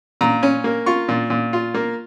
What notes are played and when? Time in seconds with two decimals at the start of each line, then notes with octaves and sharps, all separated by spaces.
0.21 A#2 A#5
0.43 C#4
0.64 A#3
0.86 F4 C#6
1.09 A#2
1.30 A#2
1.53 F4
1.74 A#3